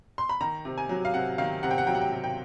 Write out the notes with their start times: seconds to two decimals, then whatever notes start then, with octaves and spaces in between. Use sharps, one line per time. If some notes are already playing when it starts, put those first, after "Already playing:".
0.18 C6
0.29 B5
0.41 D#3 A#5
0.65 C3
0.78 G#5
0.89 F#3
1.05 F5
1.14 C3 F#5
1.38 D#3 F5
1.63 C3 F#5
1.71 G5
1.78 F#5
1.87 F#3 G5
1.95 F#5
2.01 G5
2.11 C3
2.24 G5